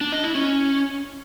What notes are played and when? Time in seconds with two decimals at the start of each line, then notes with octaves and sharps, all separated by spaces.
0.01 D4
0.12 D#5
0.24 E4
0.35 C#4